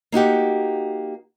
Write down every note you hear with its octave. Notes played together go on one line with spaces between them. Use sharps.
A#3 D#4 F#4 G4